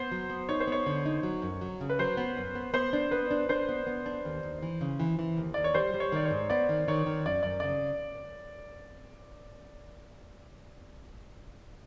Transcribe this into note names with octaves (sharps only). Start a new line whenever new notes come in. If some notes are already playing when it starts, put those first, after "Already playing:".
Already playing: B3 C5
F#3
B3
D#4 C#5
C5
B3 C#5
D3
D#4
F#3
F#2
F#3
C#3
B4
F#3 C5
B3
F#2
B3
B3 C5
D4
B3 B4
D4
D4 C5
B3
B3
D4
D#2
D#2
E3
C#3
E3
E3
D#2
D#2 D5
C#5
G3 C5
G3
C#5
D#3 D5
C#5
G#2
B3 D5
D#3
D#3 C#5
D#3
F#2 D5
F#2 D5
C#3 D5